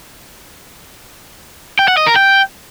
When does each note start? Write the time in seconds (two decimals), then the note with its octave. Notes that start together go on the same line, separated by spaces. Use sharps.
1.79 G5
1.88 F#5
1.97 D#5
2.06 A#4
2.16 G5